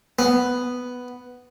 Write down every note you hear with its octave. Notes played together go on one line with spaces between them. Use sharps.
B3